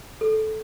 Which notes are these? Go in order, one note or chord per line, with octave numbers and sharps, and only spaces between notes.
A4